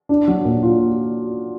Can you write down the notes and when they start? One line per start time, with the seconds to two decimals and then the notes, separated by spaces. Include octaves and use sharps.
0.09 D4
0.28 F#3
0.45 A#2
0.63 F4